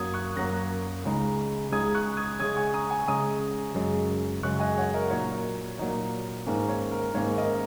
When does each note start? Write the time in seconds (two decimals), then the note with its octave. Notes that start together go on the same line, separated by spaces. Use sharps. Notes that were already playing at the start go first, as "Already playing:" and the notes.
Already playing: F#2 F#3 A#3 D#6 G#6
0.14 C#6 F#6
0.36 F#2 F#3 A#3 F#6 A#6
1.04 C#2 C#3 G#3 D#4
1.72 C#2 C#3 G#3 D#4 D#6 G#6
1.95 C#6 F#6
2.17 D#6 G#6
2.40 C#3 G#3 C#4 D#6 G#6
2.56 G#5 C#6
2.74 A#5 D#6
2.90 G#5 C#6
3.07 C#3 G#3 C#4 A#5 D#6
3.75 F#2 C#3 G#3
4.43 F#2 C#3 G#3 C#6 F#6
4.60 D#5 G#5
4.78 C#5 F#5
4.94 A#4 D#5
5.11 A#2 F#3 D#4 C#5
5.79 A#2 F#3 D#4
6.46 G#2 D#3 A#3 C#4 A#4
6.69 C#5
6.91 A#4
7.14 G#2 D#3 A#3 C#4 C#5
7.37 A#4 D#5